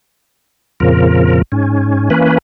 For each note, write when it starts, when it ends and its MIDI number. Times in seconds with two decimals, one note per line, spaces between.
0.80 1.42 41
0.80 1.42 46
0.80 1.42 49
0.80 1.42 53
0.80 1.42 70
1.52 2.09 44
1.52 2.09 61
2.10 2.38 52
2.10 2.38 58
2.10 2.38 61
2.10 2.38 71